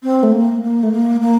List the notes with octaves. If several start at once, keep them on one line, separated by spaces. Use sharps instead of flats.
C4
A3
A#3
A#3
A3
A#3
A#3